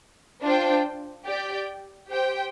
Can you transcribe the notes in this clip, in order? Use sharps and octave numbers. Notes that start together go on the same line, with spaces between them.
D4 F4 C5 G5
G4 D5 G5
G4 C5 G5